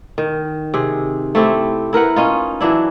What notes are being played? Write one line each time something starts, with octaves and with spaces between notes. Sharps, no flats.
D#3
C3 G#4
A3 C4 E4 G4
E4 A#4 B4 F#5
C#4 D#4 F4
E3 F#3 D4 E4